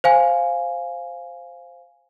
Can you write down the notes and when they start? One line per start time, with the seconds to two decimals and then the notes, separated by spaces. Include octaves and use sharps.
0.04 C5 F5 G#5